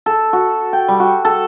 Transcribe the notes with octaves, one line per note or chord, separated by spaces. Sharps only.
A4
F#4
G5
G3
F#4
A4